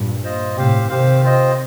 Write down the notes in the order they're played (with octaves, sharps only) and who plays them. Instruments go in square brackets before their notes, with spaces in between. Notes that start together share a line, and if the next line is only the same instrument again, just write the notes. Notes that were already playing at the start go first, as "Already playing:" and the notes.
Already playing: [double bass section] G2 A#2
[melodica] F4 C5 D#5
[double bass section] A2 C3 [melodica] C4 G4 C5 F5
[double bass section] C3 D#3 [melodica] C4 G4 C5 F5
[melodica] C4 F4 C5 D#5